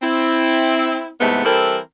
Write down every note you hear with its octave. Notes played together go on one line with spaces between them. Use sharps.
C4 E4
E2 G#2 C3 G#3 A3 B3
E3 G3 C4 E4 A4 A#4